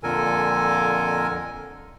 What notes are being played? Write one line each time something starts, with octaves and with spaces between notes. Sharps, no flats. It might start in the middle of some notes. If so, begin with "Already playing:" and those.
F2 A#2 D3 A4 A#4 G#5